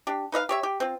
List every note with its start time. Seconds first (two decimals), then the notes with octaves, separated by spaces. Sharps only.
0.07 D4 G4
0.32 D#4 B4 D#5 F5
0.49 G4 C#5 E5
0.63 G4
0.80 C4 F4